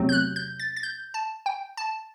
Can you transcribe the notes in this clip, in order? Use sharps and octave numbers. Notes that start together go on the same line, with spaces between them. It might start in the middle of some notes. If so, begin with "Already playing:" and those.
Already playing: E2 C3 F#3 A3 C4
G6
F#6
G6
A6
A6
G6
A5
G5
A5